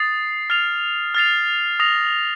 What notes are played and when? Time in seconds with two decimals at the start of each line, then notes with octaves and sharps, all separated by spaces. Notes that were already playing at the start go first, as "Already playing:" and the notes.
Already playing: D#6 A6 C7
0.50 F6 A6 C7 F7
1.14 F6 A6 C7 F7
1.80 D#6 A#6 F7